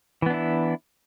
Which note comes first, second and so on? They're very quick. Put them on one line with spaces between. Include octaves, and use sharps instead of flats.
E3 B3 D4 E4